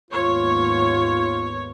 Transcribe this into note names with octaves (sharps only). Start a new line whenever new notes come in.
D#2 G#2 B3 F4 C#5